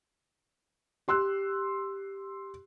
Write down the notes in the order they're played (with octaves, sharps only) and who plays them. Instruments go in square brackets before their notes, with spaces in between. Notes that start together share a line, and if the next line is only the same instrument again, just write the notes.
[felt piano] G4 C6 E6 F#6